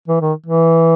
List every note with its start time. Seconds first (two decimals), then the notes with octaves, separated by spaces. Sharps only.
0.08 E3
0.21 D#3
0.46 E3